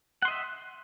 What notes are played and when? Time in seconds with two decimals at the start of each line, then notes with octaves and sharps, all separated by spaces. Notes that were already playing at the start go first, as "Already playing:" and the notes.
0.22 F#5
0.25 C6
0.28 D#5
0.31 E5